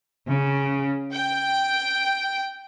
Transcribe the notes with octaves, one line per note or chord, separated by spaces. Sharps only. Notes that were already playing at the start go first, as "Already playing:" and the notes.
C#3
G5